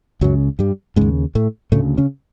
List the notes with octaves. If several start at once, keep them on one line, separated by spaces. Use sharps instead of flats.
C#2 F#2 C#3 F#3
G2 G3
D#2 G#2 C#3 G#3
A2 A3
D2 A2 C#3 A3
C#3 C#4